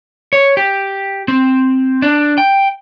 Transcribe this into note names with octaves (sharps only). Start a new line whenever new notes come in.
C#5
G4
C4
D4
G5